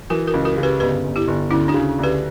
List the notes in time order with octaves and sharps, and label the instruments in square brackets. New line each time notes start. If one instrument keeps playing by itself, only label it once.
[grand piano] E3 [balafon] F#4 A#4
[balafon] F#4 A#4
[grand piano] C#2
[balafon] F#4 A#4
[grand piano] C#3
[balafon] G4 B4
[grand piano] G1 [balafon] G4 B4
[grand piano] G1
[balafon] E4 G4
[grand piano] G1
[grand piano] D2 [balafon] C#4 E4
[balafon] D4 F#4
[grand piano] C#3
[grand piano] D2 [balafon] G4 B4